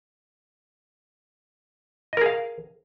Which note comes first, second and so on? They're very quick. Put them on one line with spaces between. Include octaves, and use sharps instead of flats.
D#5 A#4 G#4 F5